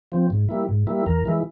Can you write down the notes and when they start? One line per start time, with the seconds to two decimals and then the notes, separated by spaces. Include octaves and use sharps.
0.12 F3 C4
0.30 G#2
0.49 G3 A#3 E4
0.69 G#2
0.87 G3 A#3 E4
1.06 E2 A#4
1.25 E3 G#3 E4